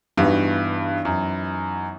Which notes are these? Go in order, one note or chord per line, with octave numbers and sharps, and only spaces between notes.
G2 E3 B3 D#4 F#4 B4
F#2